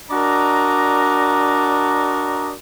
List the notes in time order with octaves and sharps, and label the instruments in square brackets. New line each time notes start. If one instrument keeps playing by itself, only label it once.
[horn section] D4 F#4 A#4 D5 D#5 A#5